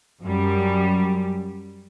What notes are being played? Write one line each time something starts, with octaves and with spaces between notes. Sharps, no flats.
F#2 G3